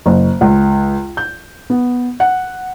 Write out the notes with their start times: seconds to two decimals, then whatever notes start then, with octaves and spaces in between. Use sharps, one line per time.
0.06 F#1
0.41 C#2
1.17 G6
1.70 B3
2.20 F#5